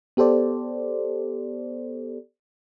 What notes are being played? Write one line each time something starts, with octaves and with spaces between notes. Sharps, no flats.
B3 G4 A4 C5 D5